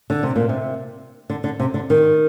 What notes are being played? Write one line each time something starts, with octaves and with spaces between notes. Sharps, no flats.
D3
C3
A#2
C3
D3
D3
C3
D3
D#3